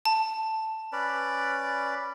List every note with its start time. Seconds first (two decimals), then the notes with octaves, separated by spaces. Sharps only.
0.05 A5
0.92 C#4 B4 D5